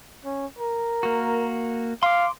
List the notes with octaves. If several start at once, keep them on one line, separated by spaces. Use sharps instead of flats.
C#4
A#4
A#3 F#4
F5 C6 D6